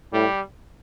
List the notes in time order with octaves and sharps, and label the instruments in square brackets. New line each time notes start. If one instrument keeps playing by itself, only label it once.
[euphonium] A2 [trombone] G3